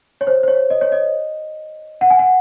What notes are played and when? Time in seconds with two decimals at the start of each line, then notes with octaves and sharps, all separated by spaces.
0.21 C#5
0.27 C5
0.43 C5
0.48 C#5
0.70 D#5
0.81 C#5
0.92 D#5
2.01 F#5
2.10 G#5
2.19 F#5